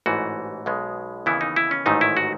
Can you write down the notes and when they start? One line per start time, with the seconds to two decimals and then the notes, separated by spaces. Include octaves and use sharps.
0.06 A1 G#2 E3 A3 F#4
0.66 B1 B2 G#3 B3
1.26 D#2 C#3 E3 B3 E4
1.41 D#4
1.56 E4
1.71 C#4
1.86 A1 G#2 D#3 F#3 A3 D#4
2.01 E4
2.17 F#4